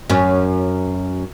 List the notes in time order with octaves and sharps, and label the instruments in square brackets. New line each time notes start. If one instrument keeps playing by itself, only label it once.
[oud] F#2 C#4